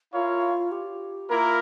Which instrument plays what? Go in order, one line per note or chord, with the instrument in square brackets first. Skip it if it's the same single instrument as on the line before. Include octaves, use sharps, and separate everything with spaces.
[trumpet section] E4 A#4 C#5 F5 [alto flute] F4
[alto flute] G4
[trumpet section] A#3 E4 A#4 [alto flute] F4